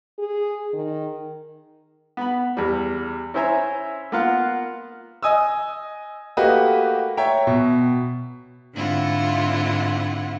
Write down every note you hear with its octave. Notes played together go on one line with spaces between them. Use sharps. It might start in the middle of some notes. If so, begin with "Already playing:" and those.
G#4
D#3
B3 B5
E2 G3
C#4 E4 C5 E5 G#5 A#5
A#3 B3 F4 F5 F#5
D#5 G#5 D#6 E6
A3 A#3 F#4 G4 B4 D#5
C#5 E5 G5 A#5
B2
G#2 D3 C4 E4 F4 F#5